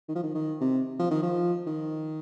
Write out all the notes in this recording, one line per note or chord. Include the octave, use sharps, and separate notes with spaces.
D#3
F3
D#3
D#3
C3
F3
D#3
F3
D#3